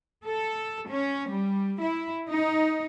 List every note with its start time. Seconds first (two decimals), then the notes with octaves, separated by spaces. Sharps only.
0.25 A4
0.88 C#4
1.30 G3
1.81 E4
2.29 D#4